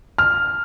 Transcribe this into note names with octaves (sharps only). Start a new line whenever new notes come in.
F6